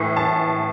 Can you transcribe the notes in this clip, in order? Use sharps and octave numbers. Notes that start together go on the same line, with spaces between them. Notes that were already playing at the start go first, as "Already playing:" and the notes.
Already playing: A2 E3
A5